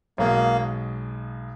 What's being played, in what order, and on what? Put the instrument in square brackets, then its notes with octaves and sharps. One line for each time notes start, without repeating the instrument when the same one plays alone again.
[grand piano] B1 B2 G#3 [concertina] A#3